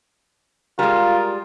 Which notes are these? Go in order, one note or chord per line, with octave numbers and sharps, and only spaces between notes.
G3 G#3 F4 A#4